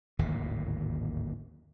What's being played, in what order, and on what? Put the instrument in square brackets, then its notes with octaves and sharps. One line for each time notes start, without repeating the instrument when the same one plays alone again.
[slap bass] D1 G#1 D#2 A#2